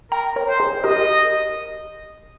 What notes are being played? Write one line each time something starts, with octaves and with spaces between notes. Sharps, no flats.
A#4 G5 A#5
A#4 C#5
C5
G#4 C5
G4 A#4 D#5